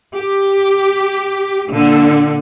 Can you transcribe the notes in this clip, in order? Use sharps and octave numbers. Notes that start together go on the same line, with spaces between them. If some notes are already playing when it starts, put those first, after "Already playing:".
G4
A#2 D3